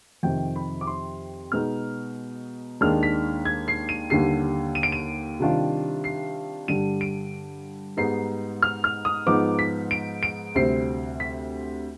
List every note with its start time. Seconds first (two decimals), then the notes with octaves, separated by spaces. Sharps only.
0.23 F2 C3 D#3 G5
0.56 B5
0.81 D6
0.87 C6
1.52 B2 G#3 B3 D#4 F6
2.81 D#2 D#3 G#3 D4 F6
3.03 B6
3.45 G#6
3.68 C7
3.89 D#7
4.10 D#2 D3 G3 C7
4.75 D#7
4.83 D7
4.92 D#7
5.40 C3 D#3 G3 D4 F4
6.04 C7
6.68 G2 D3 G3 D4 D#7
7.01 D7
7.97 G#2 G3 B3 D#4 C7
8.62 F6
8.84 F6
9.05 D#6
9.26 G#2 F3 B3 D#4 D6
9.59 B6
9.91 D7
10.23 D7
10.55 D2 C3 G3 C4 C7
11.20 B6